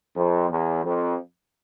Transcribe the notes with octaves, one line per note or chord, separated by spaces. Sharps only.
F2
E2
F2